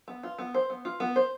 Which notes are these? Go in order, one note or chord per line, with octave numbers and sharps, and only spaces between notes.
B3
F4
B3
C5
B3
F4
B3
C5